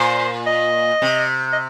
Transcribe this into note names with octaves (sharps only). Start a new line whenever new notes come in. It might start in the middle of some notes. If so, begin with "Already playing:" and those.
Already playing: A#2 C5
D#5
C3
D#5